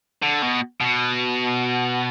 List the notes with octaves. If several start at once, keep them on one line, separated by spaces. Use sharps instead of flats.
D3
B2
B2